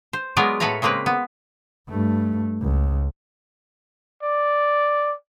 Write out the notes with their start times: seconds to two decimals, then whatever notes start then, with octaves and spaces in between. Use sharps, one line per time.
0.13 C5
0.37 F#3 G#3 B3 F4 A#4 D5
0.60 A2 A4 B4 C#5 F5 A#5
0.82 C#3 G#3 A#3 C4 B4
1.06 B3
1.89 G2 A3
2.62 C#2
4.23 D5